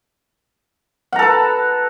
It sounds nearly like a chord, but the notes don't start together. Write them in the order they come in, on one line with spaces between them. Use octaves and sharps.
F#5 A#5 A4 B4